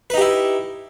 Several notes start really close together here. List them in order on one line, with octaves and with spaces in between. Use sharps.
B4 D#4 G4 E4